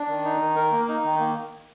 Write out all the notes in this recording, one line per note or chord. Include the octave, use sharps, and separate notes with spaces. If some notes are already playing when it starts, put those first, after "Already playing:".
Already playing: D4
D#3
D#4
D#3
A#4
A#3
D#4
D#3
A#3